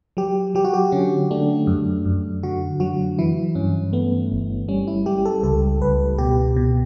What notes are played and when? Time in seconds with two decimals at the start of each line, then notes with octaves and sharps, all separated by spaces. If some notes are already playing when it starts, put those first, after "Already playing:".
0.17 F#3 G4
0.55 F#3 G4
0.65 F#4
0.74 G4
0.92 D3 C#4
1.31 A3 D4
1.67 F#2
2.05 F#2
2.43 D3 F#4
2.80 F#3 F#4
3.18 E3 E4
3.55 G2 C#4
3.93 A3 B3
4.31 G1
4.68 G3 C#4
4.87 E4
5.06 G3 G4
5.25 A4
5.43 C#2 A4
5.81 C#2 B4
6.18 B2 G4
6.56 B2